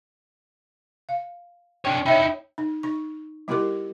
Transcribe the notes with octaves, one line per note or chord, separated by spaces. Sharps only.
F5
D4 C#5 G5
D#4 E4 C#5 E5 G5
D#4
D#4 C#6
G3 B3 E4 G4 A#4 D6